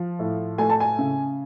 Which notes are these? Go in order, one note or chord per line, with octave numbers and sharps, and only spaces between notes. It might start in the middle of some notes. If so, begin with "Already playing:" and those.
Already playing: F3
A2
A3 G#5
A5
G#5
C#3